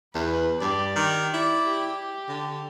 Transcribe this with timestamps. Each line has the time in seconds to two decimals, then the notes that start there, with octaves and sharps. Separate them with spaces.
0.14 E2 B4
0.61 G2 G4 D5
0.96 D#3
1.34 E4 D5
1.67 G4
2.28 D3